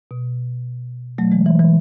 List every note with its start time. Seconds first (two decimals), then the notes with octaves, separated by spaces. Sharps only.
0.11 B2
1.18 B2 F#3 A3
1.32 E3 G#3
1.46 E3
1.59 E3